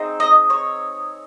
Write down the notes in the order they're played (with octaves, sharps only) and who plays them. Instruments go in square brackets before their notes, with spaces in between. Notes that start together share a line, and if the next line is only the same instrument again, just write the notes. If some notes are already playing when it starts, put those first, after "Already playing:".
Already playing: [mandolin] C4 D#4 G#4
D#5
C#5